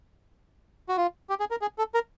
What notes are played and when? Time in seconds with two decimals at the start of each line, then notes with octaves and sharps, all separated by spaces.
0.89 F#4
0.97 F4
1.30 G4
1.40 G#4
1.51 A#4
1.62 G#4
1.78 A4
1.94 A#4